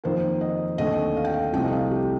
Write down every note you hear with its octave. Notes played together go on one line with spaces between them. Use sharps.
F2 D#3 A#3 C5
D#5
D#2 D3 A3 C4 D#5
F5
G5
F5
C2 C3 F3 A3 C4 G5
D#5
F5
G4